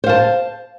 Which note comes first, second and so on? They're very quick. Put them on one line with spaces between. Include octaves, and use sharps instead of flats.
C5 F5 A5